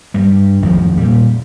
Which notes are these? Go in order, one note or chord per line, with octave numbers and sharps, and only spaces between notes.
G2 G3
A1 F2 D#3 F3
A#2 G3